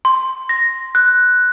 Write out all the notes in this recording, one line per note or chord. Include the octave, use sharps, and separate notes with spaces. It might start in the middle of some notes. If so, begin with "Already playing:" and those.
C6
A#6
F#6